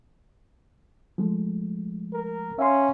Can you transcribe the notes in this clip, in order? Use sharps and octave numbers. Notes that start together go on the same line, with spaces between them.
F3 G#3 A3
A#4
C#4 E5 F5 C6